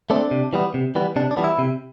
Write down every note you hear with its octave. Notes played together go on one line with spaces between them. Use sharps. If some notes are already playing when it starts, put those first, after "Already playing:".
A3 C4 D4
C3
E3 G3 B3
C3
E3 G3 B3
C3 D4
D4
E3 G3 B3
E4
C3